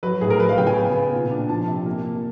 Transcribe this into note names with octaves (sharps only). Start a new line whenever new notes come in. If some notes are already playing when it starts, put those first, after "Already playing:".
F#3 B4
A2 G#4
A#4
F#3 B4
F5
C#3 G5
G#5
B3
B3
A#2
D4
F3 A5
C3
A#3
A#3